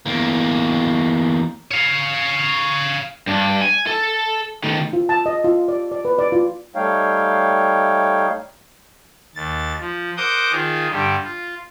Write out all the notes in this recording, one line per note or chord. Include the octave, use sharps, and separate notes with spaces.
E2 A#3
C#5 F5
G2 D4
G#5
A4
D#3 A3
F4
A5
D#5
F4
D5
D5
B4
D5
F4
G3 A3 D#4 C#5 F5 G5
D#2 A6
F3
A#4 C5 F#5 D6 D#6 G6
D#3 F4 G#4
G2 D3 G4
F4